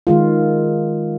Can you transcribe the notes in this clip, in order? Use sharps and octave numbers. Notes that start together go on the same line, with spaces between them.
D#3 G#3 F4